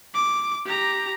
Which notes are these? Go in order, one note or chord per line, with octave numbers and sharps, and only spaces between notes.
D6
G4 A#5